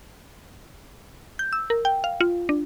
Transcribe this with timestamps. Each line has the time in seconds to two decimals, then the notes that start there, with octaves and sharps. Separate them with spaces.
1.39 G6
1.53 E6
1.70 A#4
1.85 G5
2.04 F5
2.21 F4
2.49 D4